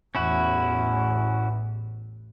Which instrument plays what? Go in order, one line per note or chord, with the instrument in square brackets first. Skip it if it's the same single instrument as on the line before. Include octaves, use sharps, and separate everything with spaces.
[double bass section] A1 E2 [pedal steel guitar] C#4 E4 F#4